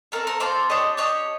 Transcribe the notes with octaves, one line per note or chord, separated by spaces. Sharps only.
C4 F4 A4 A#4
A#4
C4 F4 A4 C5 D5
D4 G4 C#5 D#5
D4 G4 C#5 D#5